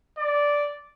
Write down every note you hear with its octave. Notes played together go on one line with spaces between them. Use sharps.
D5